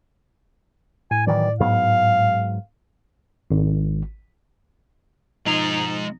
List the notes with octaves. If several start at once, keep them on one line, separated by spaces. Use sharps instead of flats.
A2 G#5
D#3 E3 F#3 D5
G#2 F#3 B3 F5
G#1
B2 F3 G#3 D#4 A#5